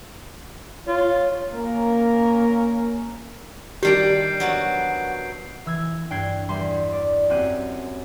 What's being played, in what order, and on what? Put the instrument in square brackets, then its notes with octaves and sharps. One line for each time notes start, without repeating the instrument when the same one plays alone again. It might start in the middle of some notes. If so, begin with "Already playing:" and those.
[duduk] F4 [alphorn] C#5
[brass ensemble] A#3 C#4 A#4
[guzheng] D#3 G3 D4 [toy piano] G4 [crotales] G6 C7 D7
[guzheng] F#3 B3 F#4
[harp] E3 E6 G#6
G2 G5 F#6 G#6 C7
E2 G3 C6
D5
F#2 C4 G4 F#6 D#7